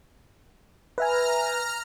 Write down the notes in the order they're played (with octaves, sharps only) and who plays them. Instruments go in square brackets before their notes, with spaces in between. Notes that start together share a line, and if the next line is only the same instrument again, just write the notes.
[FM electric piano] B4 E5 G#5 [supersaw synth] A#5 F6